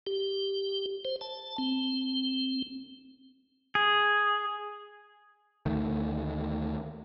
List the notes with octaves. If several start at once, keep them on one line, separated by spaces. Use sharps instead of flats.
G4
C5
A5
C4
G#4
D2 D#3 A3